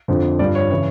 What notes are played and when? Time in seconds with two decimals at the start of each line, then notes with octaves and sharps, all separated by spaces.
0.08 F2 D3 F3
0.39 G2 F3 D5
0.55 C#5
0.70 C#3 E3 C#5